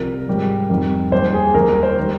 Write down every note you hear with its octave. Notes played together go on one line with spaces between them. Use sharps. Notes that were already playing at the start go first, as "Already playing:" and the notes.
Already playing: C2 C3 F3 A#4
G#2 D#3 G3
F2 D#3 G3
D#2 D#3 G3 C5
G#4
D#2 D#3 G3 A#4
A#4
C5
D#3 G3